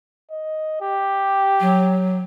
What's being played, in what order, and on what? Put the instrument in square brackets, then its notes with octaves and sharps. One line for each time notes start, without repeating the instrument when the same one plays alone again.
[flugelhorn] D#5
G4
[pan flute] F#3